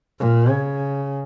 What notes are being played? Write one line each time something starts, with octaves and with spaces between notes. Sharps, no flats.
A#2
C#3